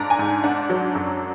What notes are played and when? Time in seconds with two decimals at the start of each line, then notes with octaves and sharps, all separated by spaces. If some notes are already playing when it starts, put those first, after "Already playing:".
Already playing: G#2 D4 A#5
0.10 G#5
0.19 G#2
0.44 D4 F#5
0.69 F#3
0.95 F#2